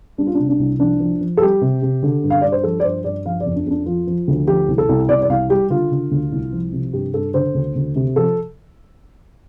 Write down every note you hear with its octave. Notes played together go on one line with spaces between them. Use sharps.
G3 D4
F4
C3 D4
D4
C2
F3 D4
F3
F3
A4
G3 G4
C3
C3
D3
G2
F5
G2 D5
C5
F3 A4
D5
G2 C5
G2 D5
F3 F5
D5
F2
D4
F2 D4
F3 F4
F3
D2
F3 G4
C2
A4
C2
C2 D5
D5
C2 F5
G3 G4
D3 F4
D3
D2
C2
F3
C3
G2 G4
G2 A4
D3 C5
D2
D2
C3
F3 A4